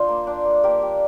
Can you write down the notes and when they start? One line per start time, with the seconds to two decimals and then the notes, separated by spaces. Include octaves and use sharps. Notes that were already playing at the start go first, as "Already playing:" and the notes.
Already playing: D4 F4 C5
0.08 A#3
0.27 D4
0.45 A#3
0.63 A#3 G4 A#4
0.82 G3